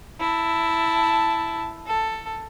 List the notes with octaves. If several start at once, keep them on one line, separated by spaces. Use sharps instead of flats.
E4 A5
A4